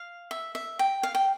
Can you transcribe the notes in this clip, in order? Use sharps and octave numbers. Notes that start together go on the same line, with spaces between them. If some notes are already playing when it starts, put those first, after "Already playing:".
Already playing: F5
E5
E5
G5
F5
G5